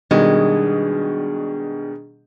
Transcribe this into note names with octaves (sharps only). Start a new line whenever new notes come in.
B2 D#3 G3 G#3 D4 G#4